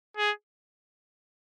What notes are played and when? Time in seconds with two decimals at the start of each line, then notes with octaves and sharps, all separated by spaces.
0.17 G#4